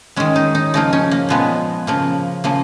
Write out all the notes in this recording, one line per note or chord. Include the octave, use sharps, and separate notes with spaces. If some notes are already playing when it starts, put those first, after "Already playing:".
D#3 G#3 C#4
D#4
D#4
C#3 F3 A#3 D#4
C#4
A#3
A#2 F3 G#3 B3
C#3 F3 A#3
C#3 F3 A#3